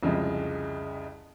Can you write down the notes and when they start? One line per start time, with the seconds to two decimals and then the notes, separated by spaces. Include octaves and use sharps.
0.03 C2 F2 C#3 G#3